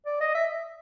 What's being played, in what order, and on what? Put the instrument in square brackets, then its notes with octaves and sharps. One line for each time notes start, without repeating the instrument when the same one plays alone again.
[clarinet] D5
D#5
E5